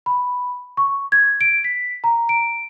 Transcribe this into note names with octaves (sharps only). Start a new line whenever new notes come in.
B5
C#6
G#6
D7
B6
A#5
D7